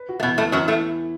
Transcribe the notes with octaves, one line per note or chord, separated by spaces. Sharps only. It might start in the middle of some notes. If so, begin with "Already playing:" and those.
Already playing: B4
F#4
A3
E2 B2 B3
A2 A3 B3
F#2 E3 F#3
A2 A3 E4